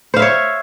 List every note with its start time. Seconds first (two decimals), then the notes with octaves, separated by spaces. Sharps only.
0.14 C5
0.16 F5
0.19 E5
0.22 C#5